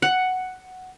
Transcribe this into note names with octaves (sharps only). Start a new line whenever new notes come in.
F#5